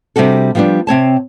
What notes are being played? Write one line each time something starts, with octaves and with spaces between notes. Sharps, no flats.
C3 G3 D4 F#4 A4
F3 G3 B3 C#4 D4
C3 C4 C#5 A5